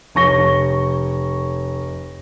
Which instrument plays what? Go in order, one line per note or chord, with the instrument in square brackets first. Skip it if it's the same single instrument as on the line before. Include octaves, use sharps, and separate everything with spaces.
[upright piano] F1 C#5 C#6 A#6 G7